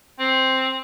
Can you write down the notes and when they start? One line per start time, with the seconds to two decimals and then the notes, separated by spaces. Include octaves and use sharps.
0.19 C4